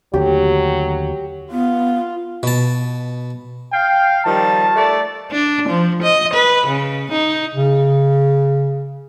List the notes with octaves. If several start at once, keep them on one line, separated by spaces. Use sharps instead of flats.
D#2 D3 F#3 A3 G4
B3 F4
B2 A5
F5 G5
D#3 F3 G3 A5
A3 D5
D4
F3
D#5
B4
C#3
D#4
C#3